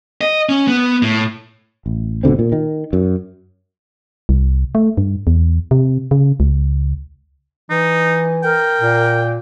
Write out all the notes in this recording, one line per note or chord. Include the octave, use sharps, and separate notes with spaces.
D#5
C#4
B3
A2
A1
G#1 B2 D3 C4
A#2
D#3
F#2
C2
A3
G2
E2
C3
C#3
C#2
E3 D#4
A#4 G5
A#2